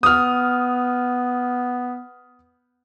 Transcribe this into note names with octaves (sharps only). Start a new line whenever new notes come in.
B3 D#6 F6